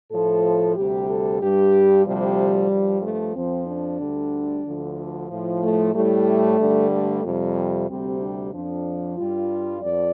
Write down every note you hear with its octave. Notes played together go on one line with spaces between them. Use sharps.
A2 F3 A4
D2 C3 G3 G4
A4
G2 G3 G4
D2 C3 F3 G3
G2 F3
A3
F2 F3 C4
D4
D2 D3 G3
D2 D3 F3
A2 F3
A3
A2 G3 A3
G2 D3 G3
A3
F2 C3 G3
D2 C3 G3 C4
D4
F2 F3 D4
G2 G3 F4
F2 D5